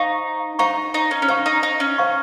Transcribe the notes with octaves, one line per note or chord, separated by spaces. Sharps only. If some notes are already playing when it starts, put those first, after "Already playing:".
Already playing: D#4 C5 F5 A#5 C#6
D#4 C5 F5 A#5 C#6
D#4
C#4
C#4
D#4 C5 F5 A#5 C#6
D#4
D#4
C#4
C5 F5 A#5 C#6